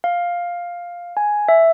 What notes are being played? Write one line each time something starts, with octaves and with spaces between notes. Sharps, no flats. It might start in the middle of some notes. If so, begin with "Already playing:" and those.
F5
G#5
E5